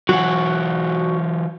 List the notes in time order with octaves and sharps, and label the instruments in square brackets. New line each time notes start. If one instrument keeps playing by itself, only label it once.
[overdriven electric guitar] E3 F#3 [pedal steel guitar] F#4 F#5